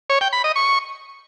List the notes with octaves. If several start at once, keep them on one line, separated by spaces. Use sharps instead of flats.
C#5
G5
B5
D#5
C#6